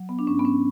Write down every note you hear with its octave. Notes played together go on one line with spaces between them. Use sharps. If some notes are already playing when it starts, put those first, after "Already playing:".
Already playing: F#3
B3
D4
G#2 C#4
B3
C#4